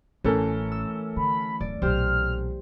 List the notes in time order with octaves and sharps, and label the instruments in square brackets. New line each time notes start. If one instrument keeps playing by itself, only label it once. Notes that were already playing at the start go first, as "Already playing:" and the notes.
[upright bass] A1 [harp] E3 A3 [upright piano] C#4 A4 A#4
[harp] E6
[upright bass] D3 [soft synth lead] B5
[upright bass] D1 [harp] D5
[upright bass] B1 A#2 [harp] G4 C5 [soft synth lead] F6